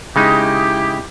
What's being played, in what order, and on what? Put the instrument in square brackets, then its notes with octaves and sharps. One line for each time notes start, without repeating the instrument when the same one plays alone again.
[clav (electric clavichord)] C#3 G#3 D#4 [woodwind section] E4 G4